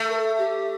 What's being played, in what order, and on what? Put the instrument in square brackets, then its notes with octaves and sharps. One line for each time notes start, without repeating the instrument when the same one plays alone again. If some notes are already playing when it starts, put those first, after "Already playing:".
Already playing: [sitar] A3
[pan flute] A#4
A4
G4